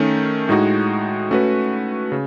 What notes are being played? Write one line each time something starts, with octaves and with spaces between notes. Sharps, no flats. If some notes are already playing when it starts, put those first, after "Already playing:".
Already playing: D#3 A3 C#4
A2 G#3 D#4 F#4
A3 C#4 F#4 B4
C#3